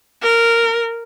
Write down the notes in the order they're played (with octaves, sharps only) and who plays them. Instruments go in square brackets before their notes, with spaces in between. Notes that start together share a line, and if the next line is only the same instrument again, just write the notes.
[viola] A#4